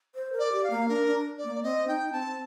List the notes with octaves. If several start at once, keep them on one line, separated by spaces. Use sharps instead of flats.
C5
A#4
D5
G4
F5
A#3
D4 A#4
D4
D5
A#3
D5
C4 D#5
D#4 G5
C4 A5